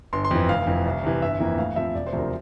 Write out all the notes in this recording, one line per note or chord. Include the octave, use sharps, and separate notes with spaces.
G1 C6
C6
F2 E3
F1 F5
F2 E3
C2
C3 E3
G1 E5
F2 E3 A#3 E4
A2 F5
F3 C4 E5
E1 D5
C5
D2 C3 F3
A#4